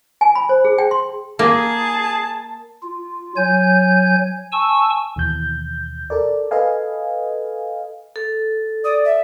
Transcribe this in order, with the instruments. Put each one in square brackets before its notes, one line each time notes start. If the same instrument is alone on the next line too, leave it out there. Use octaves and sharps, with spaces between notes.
[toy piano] G#5
B5
C5
G#4
G5
C6
[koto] A#3 [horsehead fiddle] G#4 [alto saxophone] A5
[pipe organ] F4
F#3 C#5 G#5 G6
G#5 A5 C#6 E6
[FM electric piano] D#2 B2 E3 G6
A4 A#4 D5
A4 B4 D#5 F5 G#5
[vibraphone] A4
[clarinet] D5 [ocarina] D#6
[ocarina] E5